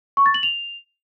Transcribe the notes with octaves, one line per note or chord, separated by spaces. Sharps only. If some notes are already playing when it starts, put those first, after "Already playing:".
C#6
A6
F#7
F7